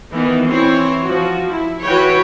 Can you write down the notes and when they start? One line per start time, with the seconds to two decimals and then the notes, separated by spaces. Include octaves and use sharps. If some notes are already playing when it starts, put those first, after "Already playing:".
0.12 D#3 E3 B3 D#4
0.48 E3 C4 E4 C5 C#5
1.03 F3 F#4
1.51 E4
1.85 E3 F#4 B4 C#5 G5